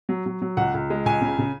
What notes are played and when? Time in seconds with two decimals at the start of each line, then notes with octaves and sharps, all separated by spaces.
0.09 F#3
0.26 F#3
0.42 F#3
0.57 C#2 F#5
0.74 C#2
0.90 G#3
1.06 C#2 G#5
1.21 C#3
1.39 C#3